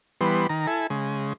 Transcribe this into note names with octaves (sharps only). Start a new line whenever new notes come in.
E3 G3 B3 C6
D#3 A#5
E4 A4 G#5
C#3 G#3